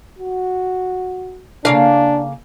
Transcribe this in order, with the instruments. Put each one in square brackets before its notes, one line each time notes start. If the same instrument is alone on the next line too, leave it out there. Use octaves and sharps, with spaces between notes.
[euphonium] F#4
[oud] C#3 A#3 F5 [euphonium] D4